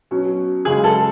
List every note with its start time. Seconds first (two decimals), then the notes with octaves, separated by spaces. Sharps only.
0.11 B2 F#3 C#4
0.65 F#2 C#3 G#3 G#4
0.84 A4